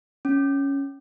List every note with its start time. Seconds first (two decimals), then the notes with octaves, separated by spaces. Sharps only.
0.25 C#4